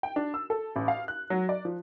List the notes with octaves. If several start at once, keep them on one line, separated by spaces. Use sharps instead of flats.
G5
D4
E6
A4
A1
F5
F#6
F#3
D5
F3